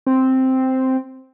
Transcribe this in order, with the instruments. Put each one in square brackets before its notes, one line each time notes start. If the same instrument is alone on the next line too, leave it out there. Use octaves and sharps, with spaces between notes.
[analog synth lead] C4